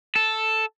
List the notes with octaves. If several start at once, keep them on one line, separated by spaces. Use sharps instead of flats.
A4